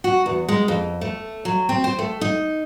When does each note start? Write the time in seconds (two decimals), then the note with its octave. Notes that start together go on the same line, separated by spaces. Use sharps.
0.04 F#4
0.26 E2
0.49 G#3
0.68 F2
1.01 A3
1.45 F#3
1.69 C4
1.84 C5
1.99 A3
2.21 D#4